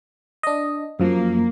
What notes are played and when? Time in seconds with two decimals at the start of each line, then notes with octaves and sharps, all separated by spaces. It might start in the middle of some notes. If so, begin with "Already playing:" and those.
0.43 D4 D#5
1.00 F#2 F3 A#3